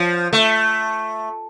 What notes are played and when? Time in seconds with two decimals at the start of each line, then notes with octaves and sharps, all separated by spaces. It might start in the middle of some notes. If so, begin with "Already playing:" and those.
Already playing: F3
0.33 A3